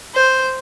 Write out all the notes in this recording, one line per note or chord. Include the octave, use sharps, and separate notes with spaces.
C5